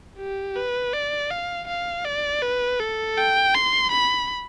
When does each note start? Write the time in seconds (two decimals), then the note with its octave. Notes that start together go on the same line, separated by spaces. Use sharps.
0.18 G4
0.55 B4
0.93 D5
1.30 F5
1.68 F5
2.05 D5
2.43 B4
2.80 A4
3.18 G5
3.55 C6
3.92 B5